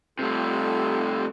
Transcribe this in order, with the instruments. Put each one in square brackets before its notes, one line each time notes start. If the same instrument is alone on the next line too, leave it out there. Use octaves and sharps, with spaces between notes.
[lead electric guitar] C3 A3 [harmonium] G3 F4 A4